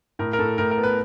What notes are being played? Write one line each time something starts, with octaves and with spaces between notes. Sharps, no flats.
A2 A#4
A#4
A2 A4
A2 A#4
A#4
B3
B4